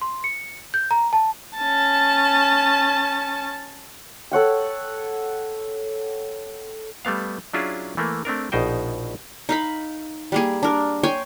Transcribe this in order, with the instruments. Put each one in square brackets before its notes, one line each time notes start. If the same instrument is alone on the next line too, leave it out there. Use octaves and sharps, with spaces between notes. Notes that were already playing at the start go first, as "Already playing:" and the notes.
[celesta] C6
C#7
G6
A#5
A5
[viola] C#4 A5
[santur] A4 C#5 F#5 G5
[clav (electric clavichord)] G3 A3 B3 F5
F#3 C#4 D4 E4 F4 G#4
E3 A3 A#3
A3 C4 D4 A#4
A#1 B2 D#4 C5 G5
[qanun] D#4 F5 B5
G3 A#3 G#4
D4 A#4
C#5 G5 G#5 C6